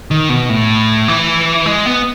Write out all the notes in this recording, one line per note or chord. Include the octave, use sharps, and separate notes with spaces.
D#3
B2
A2
E3
G#3
B3